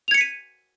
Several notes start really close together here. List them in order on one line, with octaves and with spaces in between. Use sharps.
F7 G#6 C#7 B6 D#7